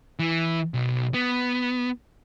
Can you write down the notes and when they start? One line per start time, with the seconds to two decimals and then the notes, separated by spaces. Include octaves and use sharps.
0.19 E3
0.74 B1
1.14 B3